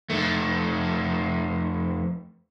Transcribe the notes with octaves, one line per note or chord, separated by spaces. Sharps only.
F2 A3